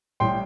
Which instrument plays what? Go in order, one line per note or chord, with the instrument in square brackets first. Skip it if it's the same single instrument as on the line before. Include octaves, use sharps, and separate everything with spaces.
[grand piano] A1 A2 G3 G5 C6